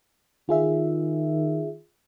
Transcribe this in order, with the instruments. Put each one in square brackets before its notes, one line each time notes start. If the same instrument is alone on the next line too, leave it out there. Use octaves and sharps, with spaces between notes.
[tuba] D#3 [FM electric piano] F4 G#4 E5